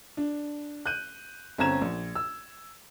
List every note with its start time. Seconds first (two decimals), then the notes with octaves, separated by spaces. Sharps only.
0.17 D4
0.86 F#6 G6 D#7
1.58 G1 C4 C#4 A#5 G#6 E7
1.81 A#1
2.15 E6